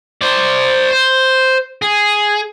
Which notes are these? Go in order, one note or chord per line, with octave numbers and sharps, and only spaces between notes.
C5 D5
C5
G#4